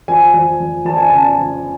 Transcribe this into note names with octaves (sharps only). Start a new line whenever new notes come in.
F2 G#5
F2
F2
F2 A5
G#5
C#3 A5
A5
F2